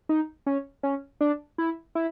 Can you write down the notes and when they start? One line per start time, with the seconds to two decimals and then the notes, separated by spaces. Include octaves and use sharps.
0.09 D#4
0.46 C#4
0.83 C#4
1.21 D4
1.58 E4
1.95 E4